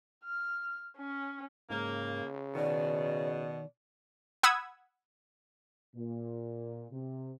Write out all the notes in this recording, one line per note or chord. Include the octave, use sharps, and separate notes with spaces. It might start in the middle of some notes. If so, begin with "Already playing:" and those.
F6
C#4
G#2 C#3 A#3
B2 D#3 D5
F#5 B5 D#6 E6 G#6
A#2
C3